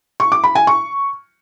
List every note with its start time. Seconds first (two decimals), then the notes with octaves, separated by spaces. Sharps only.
0.20 C#6
0.32 D6
0.44 B5
0.55 G#5
0.67 C#6